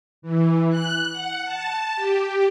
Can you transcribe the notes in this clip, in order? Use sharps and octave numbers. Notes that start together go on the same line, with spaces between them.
E3
F#6
F#5
A5
G4